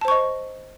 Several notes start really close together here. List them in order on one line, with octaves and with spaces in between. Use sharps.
A5 C5 C#6 D#5